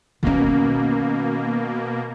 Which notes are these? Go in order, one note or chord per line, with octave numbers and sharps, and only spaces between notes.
B2 D#3 A#3 C#4